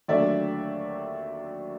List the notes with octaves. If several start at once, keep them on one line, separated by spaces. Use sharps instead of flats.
D#2 D3 F#3 A3 D5 E5